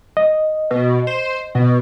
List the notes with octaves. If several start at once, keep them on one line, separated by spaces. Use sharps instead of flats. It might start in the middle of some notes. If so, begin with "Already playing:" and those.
D#5
B2
C5
B2